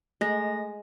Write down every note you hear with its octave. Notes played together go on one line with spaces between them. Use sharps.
G#3 A3 A#6